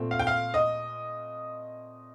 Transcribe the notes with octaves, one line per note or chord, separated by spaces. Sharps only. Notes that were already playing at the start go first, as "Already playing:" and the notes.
Already playing: A#2 A3 C4
F5
G5
F5
D#5